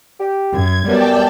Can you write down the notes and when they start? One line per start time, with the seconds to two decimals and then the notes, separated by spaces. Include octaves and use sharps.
0.19 G4
0.53 F#2 G#6
0.88 F#2 G3 B3 D5 G5 A5